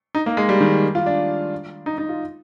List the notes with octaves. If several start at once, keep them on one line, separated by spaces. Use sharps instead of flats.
D#4
A#3
G#3
G3
D#3
F4
D4
D#4
D#4
F4